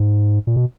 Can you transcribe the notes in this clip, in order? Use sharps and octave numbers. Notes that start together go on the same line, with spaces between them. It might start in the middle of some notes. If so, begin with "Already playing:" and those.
Already playing: G#2
A#2
B2